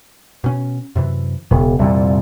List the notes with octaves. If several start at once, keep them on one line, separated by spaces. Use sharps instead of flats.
B2 C#4
F#2 C3 E3
E1 C#3 B3
C2 F2 A#2 E3